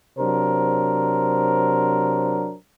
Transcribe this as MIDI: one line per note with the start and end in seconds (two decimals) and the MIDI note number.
0.18 2.54 48
0.18 2.54 54
0.18 2.54 62
0.18 2.54 70
0.18 2.54 72